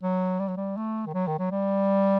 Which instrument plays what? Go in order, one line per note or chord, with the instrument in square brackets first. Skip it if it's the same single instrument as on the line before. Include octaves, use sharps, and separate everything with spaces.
[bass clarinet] F#3
G3
F#3
G3
A3
D#3
F#3
D#3
F#3
G3